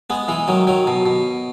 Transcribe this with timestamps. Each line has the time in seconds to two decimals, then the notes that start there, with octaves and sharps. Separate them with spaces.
0.10 G#3 B3
0.28 E3 G#3
0.48 D#3 F#3
0.67 D#3 F#3
0.87 B2
1.06 B2